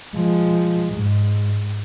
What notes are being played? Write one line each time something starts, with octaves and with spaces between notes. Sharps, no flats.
F3 G#3
G#2